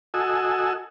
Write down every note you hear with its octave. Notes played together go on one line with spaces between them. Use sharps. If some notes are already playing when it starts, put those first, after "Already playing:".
F#4 A4 D#5 G#5 E6